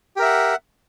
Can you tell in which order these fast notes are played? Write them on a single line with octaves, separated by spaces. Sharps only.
G4 A#4 E5 F#5